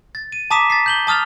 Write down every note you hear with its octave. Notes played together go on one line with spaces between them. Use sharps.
A6
D#7
A5 A#5 D6 D#6 B6 E7
A6 B6 C7
G6 F#7 G7
A5 D#6 F6 A6 F7